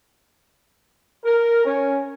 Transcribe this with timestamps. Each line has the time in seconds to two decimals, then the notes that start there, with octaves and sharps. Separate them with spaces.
1.25 A#4
1.65 C#4